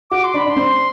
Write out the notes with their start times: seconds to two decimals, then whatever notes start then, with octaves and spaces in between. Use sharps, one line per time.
0.11 F#4 D6
0.24 C6
0.34 D4 B5
0.46 D4 C6
0.56 C4